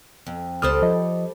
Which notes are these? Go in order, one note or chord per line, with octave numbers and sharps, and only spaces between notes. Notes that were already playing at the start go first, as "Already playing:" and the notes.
F2
C#2 G3 A4 C5 D#6 F6
F3 D#5